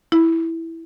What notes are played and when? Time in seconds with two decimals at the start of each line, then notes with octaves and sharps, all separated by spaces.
0.12 E4